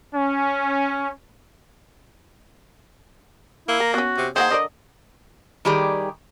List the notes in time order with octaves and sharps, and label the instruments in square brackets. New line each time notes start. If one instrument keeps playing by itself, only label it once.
[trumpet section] C#4
[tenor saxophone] A#3 [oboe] E4
[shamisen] A#4 [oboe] A#5
[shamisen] B3 C#4 [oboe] F#4
[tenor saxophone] C3
[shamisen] D#3 A#3 F#5 [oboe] G#4 [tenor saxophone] C5
[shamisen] D3 A#4 D5 [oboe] D#5
[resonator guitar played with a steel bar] D#3 G3 G4 G#4 D5